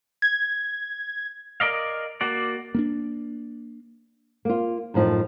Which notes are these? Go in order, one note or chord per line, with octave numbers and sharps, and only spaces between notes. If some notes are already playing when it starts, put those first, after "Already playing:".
G#6
A#4 D5 D#5 F5
A#3 F#4 D5
A#3 B3 D4
A#3 F4
F#2 A2 F3 D#4